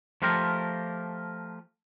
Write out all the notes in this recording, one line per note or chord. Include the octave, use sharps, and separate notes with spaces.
F3 A3 F4 G4 A#4